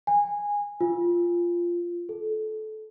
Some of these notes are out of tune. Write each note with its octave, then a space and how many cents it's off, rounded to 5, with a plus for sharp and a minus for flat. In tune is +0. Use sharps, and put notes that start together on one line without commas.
G#5 -15
F4 -5
A4 -20